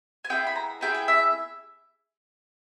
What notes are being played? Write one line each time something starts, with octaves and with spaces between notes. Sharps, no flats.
G#5
B3 E4 G#4 G5
B5
A#5
B3 E4 G#4 G5
G5
E5